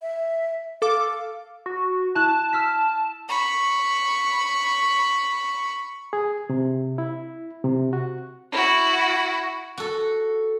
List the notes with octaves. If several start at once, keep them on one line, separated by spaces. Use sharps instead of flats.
E5
A4 F5 D6
F#4
E4 A5 F#6 E7
E6 F6 B6
B5 C#6
G#4
C3
E4
C3
F#4
E4 F#4
F#4 A4